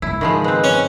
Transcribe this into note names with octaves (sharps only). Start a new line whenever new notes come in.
G#2 C#3 E4
D#3 F3 G#3 B5
G#3 C4 B4
C#4